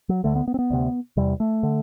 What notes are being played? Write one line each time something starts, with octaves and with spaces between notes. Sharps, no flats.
F#3
D2 D3 A3
B3
B3
C4
B3
D2 C3
E2 C3 G3
A3
D3